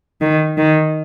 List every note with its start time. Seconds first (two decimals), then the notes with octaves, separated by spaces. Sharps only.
0.21 D#3
0.58 D#3